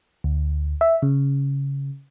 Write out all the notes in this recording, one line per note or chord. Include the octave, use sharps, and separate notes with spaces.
D2
E5
C#3